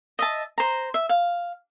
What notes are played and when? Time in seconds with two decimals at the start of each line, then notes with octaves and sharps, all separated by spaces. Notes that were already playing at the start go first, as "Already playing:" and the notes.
0.19 D#5 E5 A5
0.58 C5 A#5
0.94 E5
1.09 F5